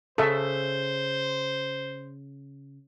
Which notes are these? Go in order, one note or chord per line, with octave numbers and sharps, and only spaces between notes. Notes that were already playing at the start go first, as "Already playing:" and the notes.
C#3 A4 C5 E5